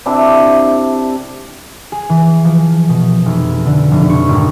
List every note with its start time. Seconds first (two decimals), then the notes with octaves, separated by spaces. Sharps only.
0.06 C3 D4 E4 G5
1.92 G#4
2.09 E3
2.45 F3
2.89 B2
3.26 F1
3.66 D3
3.92 F1
4.10 C#6
4.29 G#1